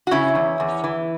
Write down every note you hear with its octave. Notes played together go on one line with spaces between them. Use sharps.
F#4
C#3 C#4 E4
E2
E2
E3